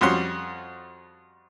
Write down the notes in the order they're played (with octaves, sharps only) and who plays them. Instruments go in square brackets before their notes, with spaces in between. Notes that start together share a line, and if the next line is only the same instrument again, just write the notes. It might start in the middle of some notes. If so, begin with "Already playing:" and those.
[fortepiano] F2 G3 C#4 F#4 C6